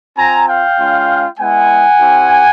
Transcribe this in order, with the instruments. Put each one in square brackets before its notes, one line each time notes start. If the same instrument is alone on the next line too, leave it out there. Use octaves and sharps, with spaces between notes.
[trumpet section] C4 F4 G#5 A#5
F5 G5
G#3 C#4 F4
G#3 B3 E4 F#5 G#5
C4 E4 G4